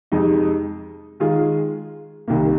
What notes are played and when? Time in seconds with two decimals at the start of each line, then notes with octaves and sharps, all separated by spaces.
0.12 F2 C3 G#3 D#4
1.20 D#3 G#3 F4 G#4
2.28 C2 C3 D#3 A#3